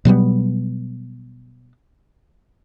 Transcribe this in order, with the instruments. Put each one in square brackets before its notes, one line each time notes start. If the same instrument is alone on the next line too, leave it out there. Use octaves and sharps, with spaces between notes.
[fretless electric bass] B2 F#3 G3 B3